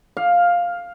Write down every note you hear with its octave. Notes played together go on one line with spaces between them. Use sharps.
F5